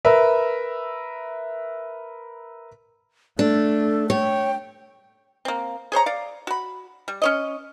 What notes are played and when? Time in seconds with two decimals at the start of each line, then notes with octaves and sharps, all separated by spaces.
0.05 A#4 B4 E5
3.39 A3 D4 A4
4.10 C#5 G5
5.45 A#3 C4
5.92 G#4 C5 C#5 A#5
6.06 D5 F5
6.47 F#4 B5
7.08 G3
7.22 C#4 C#5 D#5